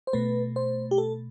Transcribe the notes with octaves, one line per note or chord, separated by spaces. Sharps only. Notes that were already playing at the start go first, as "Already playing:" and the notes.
C5
B2 A3 B4
C5
G4
A4